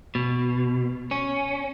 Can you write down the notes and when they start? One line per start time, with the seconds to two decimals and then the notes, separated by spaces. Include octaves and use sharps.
0.15 B2
1.11 C#4